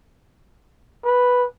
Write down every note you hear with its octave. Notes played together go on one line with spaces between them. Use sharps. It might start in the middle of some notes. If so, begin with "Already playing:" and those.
B4